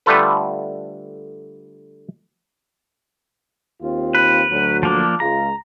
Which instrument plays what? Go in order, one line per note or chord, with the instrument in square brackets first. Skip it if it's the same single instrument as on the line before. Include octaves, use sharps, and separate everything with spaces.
[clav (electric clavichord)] D3 G3 A3 F4 A4 B4
[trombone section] D#2 C4 F4
[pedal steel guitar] B4
[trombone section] D2 F#3
[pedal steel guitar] F3 A#3 D4
[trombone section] C#2 G#3 F4 [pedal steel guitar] A#5